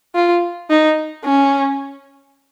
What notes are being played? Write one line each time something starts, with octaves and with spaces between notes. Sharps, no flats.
F4
D#4
C#4